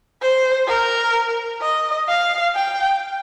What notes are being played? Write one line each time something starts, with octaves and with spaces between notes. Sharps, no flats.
C5
A#4
D#5
F5
G5